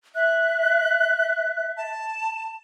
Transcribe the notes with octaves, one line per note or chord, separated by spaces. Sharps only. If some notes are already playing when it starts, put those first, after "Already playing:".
E5 F#6
A5